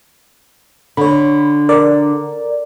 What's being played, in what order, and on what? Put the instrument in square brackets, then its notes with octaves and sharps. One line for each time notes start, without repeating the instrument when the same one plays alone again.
[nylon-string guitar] D3 [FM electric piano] C#5 B5
[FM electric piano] A#4 D5